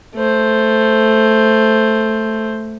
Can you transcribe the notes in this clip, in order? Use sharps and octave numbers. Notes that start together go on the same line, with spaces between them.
A3 C5